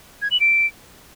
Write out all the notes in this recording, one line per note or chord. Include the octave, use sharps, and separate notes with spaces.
G#6
F#7
D7